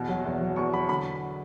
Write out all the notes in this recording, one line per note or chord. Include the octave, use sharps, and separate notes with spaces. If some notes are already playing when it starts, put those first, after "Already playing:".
Already playing: E2 B2
F#3
E2
F#3
E2 C#6
F#3 B5
D3 B5